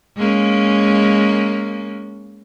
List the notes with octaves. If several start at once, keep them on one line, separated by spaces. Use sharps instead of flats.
G#3 A#3 C#4